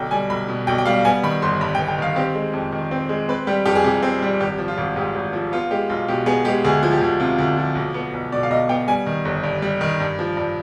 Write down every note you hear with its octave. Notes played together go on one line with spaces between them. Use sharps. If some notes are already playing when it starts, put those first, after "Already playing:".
Already playing: B1 D3 G5
G3 G#5
B1 B5
B2
B1 G5
G5
G3 F5
B3 G#5
D#3 B5
G1 C6
G2 B5
B3 G5
G5
D#3 F5
C4 G4
G#3
F2
D#3
C4
G#3
C4 B4
G3 G4
F2 G4
G#4
C3 G4
C4
G3
G#1 G4
F3
F4
G#1
G#2 G4
G#1
F3
B3 F4
G#3 G4
B1 F4
B2 G4
B3 G#4
G#3 G4
D2 G#4
F3
G4
D2
C3 F4
D2
F3
B1
B3
B1
B2 D5
F5
B1 D#5
B3 G5
G3 G#5
D#3
G1
G2
G3
D#3
G2
F3
G2